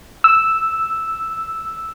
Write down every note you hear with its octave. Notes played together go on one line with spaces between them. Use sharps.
E6